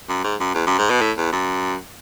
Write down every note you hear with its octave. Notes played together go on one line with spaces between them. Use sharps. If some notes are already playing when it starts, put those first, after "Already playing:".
F#2
G#2
F#2
E2
F#2
G#2
B2
A2
E2
F#2